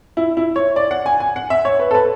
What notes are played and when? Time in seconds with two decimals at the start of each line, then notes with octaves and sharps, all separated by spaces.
0.17 E4
0.37 E4
0.56 C#5
0.76 D5
0.91 F#5
1.06 G#5
1.20 G#5
1.36 F#5
1.50 E5
1.65 C#5
1.80 B4
1.91 A4
1.95 B4